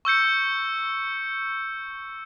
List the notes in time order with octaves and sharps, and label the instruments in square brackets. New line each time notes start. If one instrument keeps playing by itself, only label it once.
[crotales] C#6 E6 G6 C#7